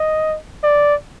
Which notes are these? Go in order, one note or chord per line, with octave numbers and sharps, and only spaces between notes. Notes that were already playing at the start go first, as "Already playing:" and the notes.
Already playing: D#5
D5